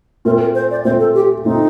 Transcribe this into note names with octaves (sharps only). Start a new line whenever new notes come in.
A#2 A3 C4 A#4
A#4
C5
D5
A#2 A3 C4 C5
A4
G4
A#2 A3 C4 D#4